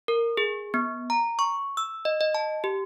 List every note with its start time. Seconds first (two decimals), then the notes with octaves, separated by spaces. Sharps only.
0.08 A#4
0.37 G#4
0.74 B3
1.10 A#5
1.39 C#6
1.77 E6
2.05 D#5
2.21 D#5
2.34 A5
2.64 G4